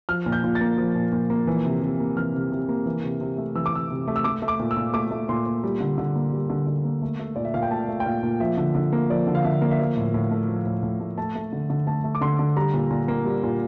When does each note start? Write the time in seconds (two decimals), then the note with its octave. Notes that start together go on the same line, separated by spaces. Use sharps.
0.09 F3 F6
0.26 A#2
0.32 G6
0.44 A#2
0.55 A6
0.61 A#3
0.78 F3
0.95 A#2
1.12 A#2
1.30 A#3
1.47 E3
1.65 C3
1.82 C3
2.00 A#3
2.17 E3 F6
2.34 C3
2.52 C3
2.69 A#3
2.86 E3
3.03 C3
3.21 C3
3.38 A3
3.55 E3 E6
3.66 D6
3.73 C3 E6
3.90 C3
4.08 A3
4.16 E6
4.24 A3 D6
4.42 A3
4.48 D6
4.60 A#2
4.71 E6
4.77 A#2
4.94 A3 D6
5.11 A3
5.29 A#2 C6
5.46 A#2
5.64 G3
5.80 D3
5.98 D3
6.15 A#3
6.33 G3
6.50 D3
6.67 D3
6.84 A#3
7.02 A3
7.19 A3
7.36 A#2 D5
7.45 E5
7.54 A#2 F5
7.62 G5
7.71 A3 A5
7.89 A3
8.00 G5
8.06 A#2 F5
8.23 A#2
8.40 F3 E5
8.57 D3
8.75 D3
8.93 A#3
9.10 F3 D5
9.27 D3
9.35 F5
9.44 D3 E5
9.62 A#3
9.71 E5
9.79 F3 F5
9.97 A2
10.14 A2
10.31 A3
10.48 F3
10.66 A2
10.83 A2
11.00 A3
11.18 A3 A5
11.35 A3
11.53 D3
11.70 D3
11.87 A3 A5
12.04 A3
12.15 D6
12.21 D3 C6
12.39 D3
12.57 G3 A#5
12.74 A#2
12.91 A#2
13.08 A#3
13.25 G3
13.43 A#2